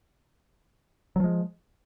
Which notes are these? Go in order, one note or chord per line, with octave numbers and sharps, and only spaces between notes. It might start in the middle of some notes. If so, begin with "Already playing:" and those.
F3 F#3 G#3